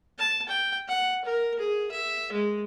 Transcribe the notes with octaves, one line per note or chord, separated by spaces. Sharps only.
A5
G5
F#5
A#4
G#4
E5
G#3